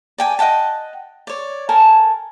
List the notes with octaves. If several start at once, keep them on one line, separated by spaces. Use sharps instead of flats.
D5 G5 G#5
D#5 F#5 G5 A5
C#5 D5
A4 A#4 G#5 A5